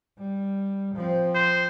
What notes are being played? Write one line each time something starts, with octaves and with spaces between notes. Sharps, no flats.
G3
F3 C4
C5